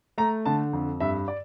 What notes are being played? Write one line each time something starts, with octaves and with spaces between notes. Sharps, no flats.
A3 A#5
D3 A5
F2
G2 E5
D5